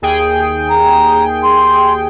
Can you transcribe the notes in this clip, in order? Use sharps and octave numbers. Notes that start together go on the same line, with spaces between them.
D#2 G#4 G5
A#5
C6